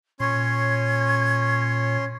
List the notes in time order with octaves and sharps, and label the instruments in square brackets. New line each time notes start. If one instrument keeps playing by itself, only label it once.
[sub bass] A#2 [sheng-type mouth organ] C#4 C#5 C6 [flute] G#6